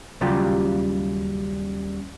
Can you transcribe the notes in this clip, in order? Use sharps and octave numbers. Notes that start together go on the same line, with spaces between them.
D#2 C#3 F#3 G3 F4 G4